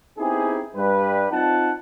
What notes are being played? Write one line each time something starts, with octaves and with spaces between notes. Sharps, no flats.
B3 C4 D#4 E4 G4 G#4
G2 G3 B4
C4 D#4 F4 F#5 A5